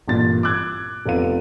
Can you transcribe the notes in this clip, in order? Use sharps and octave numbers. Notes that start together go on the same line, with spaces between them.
A1 G2 A#2 A6
D6 E6 F#6 G#6
F1 C3 B3 F4 D#7